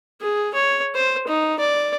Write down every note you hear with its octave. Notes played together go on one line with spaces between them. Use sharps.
G#4
C#5
C5
D#4
D5